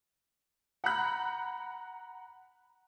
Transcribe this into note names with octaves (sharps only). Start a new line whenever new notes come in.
F#5 A#5 B5 F#6